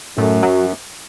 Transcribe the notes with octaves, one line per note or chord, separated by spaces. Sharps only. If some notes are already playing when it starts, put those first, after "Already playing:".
F#2 A2 A3
F#3